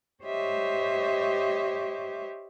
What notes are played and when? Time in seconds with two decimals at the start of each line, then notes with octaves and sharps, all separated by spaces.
0.24 G4 C5 C#5 D#5 E5